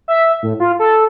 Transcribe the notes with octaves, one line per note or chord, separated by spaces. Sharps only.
E5
A2
F4
A4